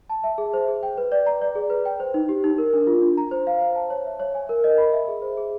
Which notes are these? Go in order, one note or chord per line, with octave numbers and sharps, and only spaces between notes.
A5
E5
G#4
C5
G#4
G5
B4
D5
A#5
D5
G#4
B4
G5
C5
D#4
G4
D#4
A#4
D4
F4
D4
A#5
C5
F5
C5
A5
C#5
E5
C#5
G#5
A#4
D#5
B5
E5
G#4
C5
G#4